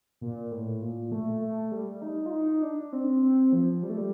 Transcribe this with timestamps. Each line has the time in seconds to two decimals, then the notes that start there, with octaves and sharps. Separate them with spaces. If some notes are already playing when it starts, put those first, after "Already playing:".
0.21 A#2
0.51 A2
0.81 A#2
1.12 A3
1.42 A3
1.72 G3
2.02 D#4
2.26 F4
2.32 D#4
2.62 D4
2.93 C4
3.23 C4
3.53 F3
3.83 G3
3.90 A3
3.97 G3